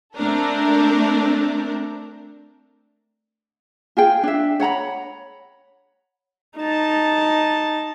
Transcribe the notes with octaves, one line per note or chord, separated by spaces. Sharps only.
A3 C4 D4 A4 A#4
F4 G#4 G5
D4 E5
C#5 F#5 A#5 B5
D#4 A5